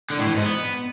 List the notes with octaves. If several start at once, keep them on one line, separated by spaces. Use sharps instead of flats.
D3
A2
E3
G#2
B3